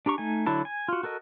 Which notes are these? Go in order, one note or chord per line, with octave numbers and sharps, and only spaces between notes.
D4 G4 A#5 C#6
A3 D#4 G#5
D3 F#3 E4 A5
G#5
F4 F#4
F#4 A4 A#4 D#5